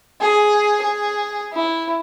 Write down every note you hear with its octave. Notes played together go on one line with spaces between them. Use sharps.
G#4
G#4
E4